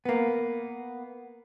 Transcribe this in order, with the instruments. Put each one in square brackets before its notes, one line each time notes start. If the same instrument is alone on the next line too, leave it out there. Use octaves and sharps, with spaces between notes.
[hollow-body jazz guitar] A#3 B3